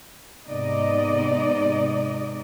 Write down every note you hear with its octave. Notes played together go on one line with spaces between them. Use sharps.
G#2 C3 B3 D#4 D5 D#5